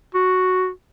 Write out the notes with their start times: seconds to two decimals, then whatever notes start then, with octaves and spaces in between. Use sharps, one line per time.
0.15 F#4